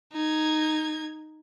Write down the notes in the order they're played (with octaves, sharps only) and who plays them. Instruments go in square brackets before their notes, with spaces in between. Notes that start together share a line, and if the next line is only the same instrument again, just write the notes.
[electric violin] D#4 G#6